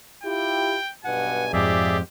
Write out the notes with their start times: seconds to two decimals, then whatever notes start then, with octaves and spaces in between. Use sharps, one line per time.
0.23 E4 F4 G4 G5
1.04 B1 G2 B2 F#5 G#5
1.53 F2 G#2 F3 G4 G#4 D5 E5